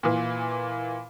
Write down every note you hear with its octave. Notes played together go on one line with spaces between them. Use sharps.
A#2 E3